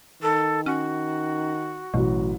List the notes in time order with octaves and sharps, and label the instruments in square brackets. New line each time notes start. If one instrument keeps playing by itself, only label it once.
[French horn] D#3 [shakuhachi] A4
[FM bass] C#4 [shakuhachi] F#4
[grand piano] A1 F#3 [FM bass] B2